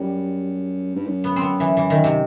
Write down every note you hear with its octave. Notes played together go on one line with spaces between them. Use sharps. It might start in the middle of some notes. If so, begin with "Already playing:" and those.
Already playing: F#2 G3
G2
F#2
B3
C4
B3
E3
E3
D#3
C3